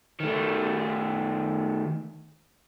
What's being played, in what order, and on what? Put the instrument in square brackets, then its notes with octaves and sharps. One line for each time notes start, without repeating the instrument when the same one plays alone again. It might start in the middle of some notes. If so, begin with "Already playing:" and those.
[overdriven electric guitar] D#3 A3